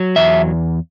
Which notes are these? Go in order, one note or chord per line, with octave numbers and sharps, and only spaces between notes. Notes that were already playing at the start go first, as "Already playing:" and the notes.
Already playing: F#3
E2 E5